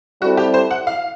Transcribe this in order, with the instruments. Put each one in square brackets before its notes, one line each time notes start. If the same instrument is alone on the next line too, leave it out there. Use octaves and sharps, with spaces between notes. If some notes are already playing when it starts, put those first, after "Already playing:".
[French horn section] G3 C4 E4 A4 [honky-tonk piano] F#4
[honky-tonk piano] G4
C5
F#5
F5